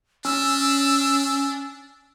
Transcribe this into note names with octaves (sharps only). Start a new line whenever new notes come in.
C#4 D4 E6